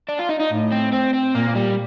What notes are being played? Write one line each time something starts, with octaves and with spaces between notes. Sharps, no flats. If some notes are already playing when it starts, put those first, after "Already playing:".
D4
F4
D#4
D#4
A2
C4
C4
C4
A#2 A#3
G3